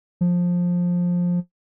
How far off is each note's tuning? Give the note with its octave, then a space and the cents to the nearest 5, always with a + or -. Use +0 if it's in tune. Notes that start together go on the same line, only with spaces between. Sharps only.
F3 +15